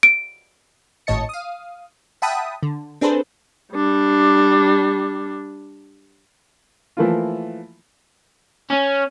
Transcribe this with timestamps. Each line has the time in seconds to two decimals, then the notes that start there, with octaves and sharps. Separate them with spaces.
0.03 D7
1.07 G#1 A2 C#5 D#5 A5 C#7
1.29 F5 D#6
2.22 E5 F#5 G5 A5 B5 D#6
2.63 D3
3.01 C4 D4 G#4 A4 B4 C5
3.73 G3 D4
6.97 E3 F3 A3 A#3 E4 F4
8.70 C#4